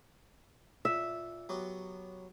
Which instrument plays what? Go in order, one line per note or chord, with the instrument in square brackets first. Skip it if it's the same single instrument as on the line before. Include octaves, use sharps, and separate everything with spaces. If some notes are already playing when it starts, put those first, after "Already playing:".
[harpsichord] A#2 [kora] E5
[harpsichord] F#3 B3 G4